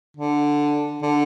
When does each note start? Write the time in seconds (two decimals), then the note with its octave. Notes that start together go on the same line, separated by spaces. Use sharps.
0.17 D3
1.02 D3